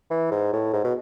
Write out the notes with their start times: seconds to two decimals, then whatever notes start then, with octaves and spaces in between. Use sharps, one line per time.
0.11 E3
0.31 G#2
0.53 A2
0.73 G#2
0.84 B2